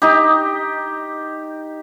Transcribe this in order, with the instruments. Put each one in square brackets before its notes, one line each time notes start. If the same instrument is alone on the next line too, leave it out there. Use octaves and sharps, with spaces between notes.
[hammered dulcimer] D#4 G4